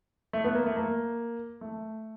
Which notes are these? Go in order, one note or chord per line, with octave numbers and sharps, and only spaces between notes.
A3
B3
A#3
A3
A#3
A3